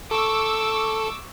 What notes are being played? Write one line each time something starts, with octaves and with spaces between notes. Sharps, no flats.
A4 C#6 D6 E6